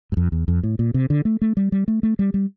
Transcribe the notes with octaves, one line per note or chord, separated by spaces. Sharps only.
G2
F2
E2
F2
A2
A#2
C3
D3
A3
A3
G3
G3
A3
A3
G3
G3